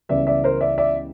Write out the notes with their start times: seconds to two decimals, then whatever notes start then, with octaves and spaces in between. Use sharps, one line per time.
0.09 C#2 C#3 E3 G3 B3 D5 E5
0.27 D5 E5
0.44 A#4 C5
0.61 D5 E5
0.78 D5 E5